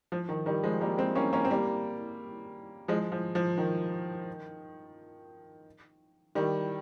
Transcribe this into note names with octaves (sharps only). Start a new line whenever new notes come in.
F3
D#3
D#3 G3
F3 G#3
G3 A#3
G#3 C4
A#3 C#4
A#3 C#4
C4
G3 A#3
F3 G#3
F3
F3
D#3
D#3 G3